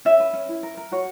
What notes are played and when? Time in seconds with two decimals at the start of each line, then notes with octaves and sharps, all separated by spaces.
0.05 C#4 E5
0.20 B4
0.33 C#4
0.48 E4
0.63 A#4
0.77 A#4
0.91 F#4 C#5